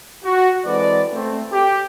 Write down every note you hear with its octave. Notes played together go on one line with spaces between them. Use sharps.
F#4
E3 G#3 C4 A4 B4 D5
A3 C4
G4